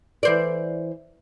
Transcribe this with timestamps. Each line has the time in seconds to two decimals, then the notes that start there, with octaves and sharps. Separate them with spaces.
0.23 E3 C5 D5